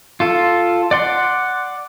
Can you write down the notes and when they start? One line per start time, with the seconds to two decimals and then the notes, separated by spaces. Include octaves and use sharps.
0.20 F4 A4
0.91 D5 F#5 C6